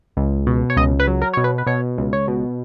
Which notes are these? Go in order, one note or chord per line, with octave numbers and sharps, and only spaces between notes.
C#2
B2
C#5
C#2 D#5
B4
F#3
A#4
B2 C#5
B4
B4
B2 C#5
C#2
C#5
B2